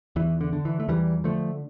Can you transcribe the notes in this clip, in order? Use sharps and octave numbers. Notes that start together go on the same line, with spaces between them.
E2 E3
D3
D3
E3
A3
E2 E3 G3
D3 F3 A3